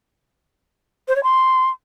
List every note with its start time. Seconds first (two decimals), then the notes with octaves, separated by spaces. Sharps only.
1.08 C5
1.16 C#5
1.23 C6